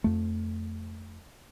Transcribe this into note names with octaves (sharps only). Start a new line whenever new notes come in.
F2 A3